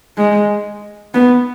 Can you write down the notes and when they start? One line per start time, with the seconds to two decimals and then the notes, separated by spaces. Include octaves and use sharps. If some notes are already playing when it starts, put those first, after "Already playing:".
0.18 G#3
1.14 B3